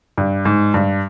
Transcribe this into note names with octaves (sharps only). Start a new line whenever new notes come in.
G2
G#2
G2